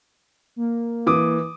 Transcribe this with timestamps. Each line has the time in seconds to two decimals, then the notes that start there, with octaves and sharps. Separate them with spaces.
0.56 A#3
1.07 E3 D6 D#6